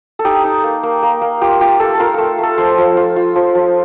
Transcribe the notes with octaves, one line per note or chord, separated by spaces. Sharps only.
A4
D#4 G4
D#4
A#3
A#3
A#3
A#3
F4 G4
F4 G4
A3 A4
A4
F4 A#4
A3 A4
A3 A4
F3 C5
F3
F4
F4
F3
F3